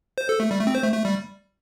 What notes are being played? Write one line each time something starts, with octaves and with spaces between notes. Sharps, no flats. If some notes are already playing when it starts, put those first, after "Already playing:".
C5
A4
A3
G3
A3
C4
C5
A3
A3
G3